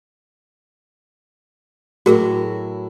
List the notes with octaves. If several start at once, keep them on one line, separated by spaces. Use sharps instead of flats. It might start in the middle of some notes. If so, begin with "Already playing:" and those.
A2 F#3 E4 F#4 G#4 A#4